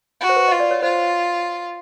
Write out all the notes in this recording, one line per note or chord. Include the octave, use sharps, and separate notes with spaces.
F#4
C5
B4
F4 D#5
D5
C#5
F4 C5